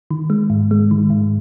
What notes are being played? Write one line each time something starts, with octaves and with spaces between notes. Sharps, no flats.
D#3
G#3
G#2
G#3
D#3
G#2